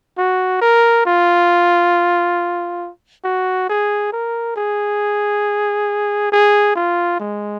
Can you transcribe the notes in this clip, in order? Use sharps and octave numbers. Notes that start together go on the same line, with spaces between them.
F#4
A#4
F4
F#4
G#4
A#4
G#4
G#4
F4
G#3